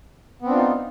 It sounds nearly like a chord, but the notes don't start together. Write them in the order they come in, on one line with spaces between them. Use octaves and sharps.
B3 C4 D4 F4 D#4